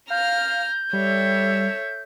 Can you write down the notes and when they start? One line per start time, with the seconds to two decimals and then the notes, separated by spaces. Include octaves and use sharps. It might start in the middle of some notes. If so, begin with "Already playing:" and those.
0.10 F5 A#5 F6 G6
0.93 G3 A4 C#5 E5